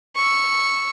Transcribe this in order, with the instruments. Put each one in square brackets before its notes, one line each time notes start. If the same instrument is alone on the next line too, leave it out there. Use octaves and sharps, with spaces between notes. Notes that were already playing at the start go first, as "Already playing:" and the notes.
[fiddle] C#6 E6